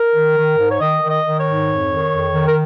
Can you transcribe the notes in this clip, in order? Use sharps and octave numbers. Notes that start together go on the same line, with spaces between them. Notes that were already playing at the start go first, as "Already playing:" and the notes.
Already playing: A#4
D#3
D#3
G#2
C#5
D#3 D#5
D#3
D#5
D#3
C#5
G#2
F2
D#3
F2
D#3
A#4